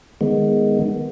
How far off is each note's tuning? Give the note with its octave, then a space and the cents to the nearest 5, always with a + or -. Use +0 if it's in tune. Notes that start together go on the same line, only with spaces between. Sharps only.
D#3 -5 G#3 -5 B3 +0